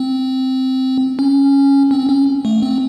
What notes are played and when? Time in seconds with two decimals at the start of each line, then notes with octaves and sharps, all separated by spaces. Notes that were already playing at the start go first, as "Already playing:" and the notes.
Already playing: C4
1.19 C#4
1.91 C4
2.09 C#4
2.45 A3
2.62 C4